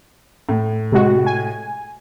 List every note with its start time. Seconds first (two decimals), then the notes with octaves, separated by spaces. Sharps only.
0.49 A2
0.92 C3 G#3 F#4
1.26 G#5